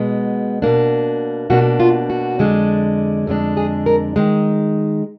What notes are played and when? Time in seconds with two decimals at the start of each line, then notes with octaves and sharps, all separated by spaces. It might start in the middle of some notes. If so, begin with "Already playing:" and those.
Already playing: B2 G#3 B3
0.62 B2 A#3 D4
1.50 B2 A#3 D4 F#4
1.80 F4
2.10 F#4
2.39 F2 D3 G#3 D4
3.27 F2 D3 G#3 D4
3.57 G#4
3.86 A#4
4.16 D#3 G#3